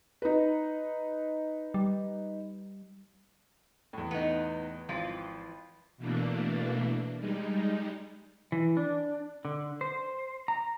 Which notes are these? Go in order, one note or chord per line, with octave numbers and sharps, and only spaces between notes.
D#4 B4
G3
E2 A2
B3 D#4
G#1 E3 F3 F4
B2 E3 A3 A#3 D4
G3 G#3 D#4
E3
D4
D3
C5
A#5